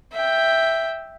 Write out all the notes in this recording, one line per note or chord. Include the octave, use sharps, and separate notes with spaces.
E5 G5